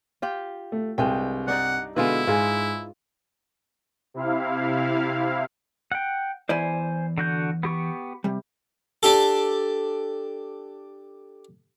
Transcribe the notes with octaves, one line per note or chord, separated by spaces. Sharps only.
F4 G4 G5
A3
C2 G2 G#3 G5
D4 D#4 D5 F#5
B2 D3 G#3 E4 F4 B4
G#2 F4 G#4 G#5
C3 E4 F5
F#5 G5
E2 E4 C5 D5 G#5
D3 F#4 G6
B3 G4 C#6
C3 G3
D4 G4 A4